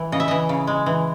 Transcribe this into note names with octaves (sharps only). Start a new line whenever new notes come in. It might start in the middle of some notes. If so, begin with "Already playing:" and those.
Already playing: E3
C#3 D#5
E5
E3 D#5
C#3
G#3
E3